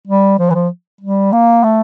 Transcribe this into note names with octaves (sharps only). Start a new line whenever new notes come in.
G3
F3
E3
F3
G3
A#3
A3